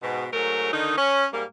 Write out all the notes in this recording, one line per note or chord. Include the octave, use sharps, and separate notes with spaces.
G#2 B2
G#2 F#3 A3 A#4
D3 D#3 D#4
C#4
G#2 G3 A#3